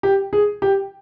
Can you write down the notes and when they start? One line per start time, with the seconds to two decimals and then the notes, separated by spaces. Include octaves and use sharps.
0.03 G4
0.33 G#4
0.62 G4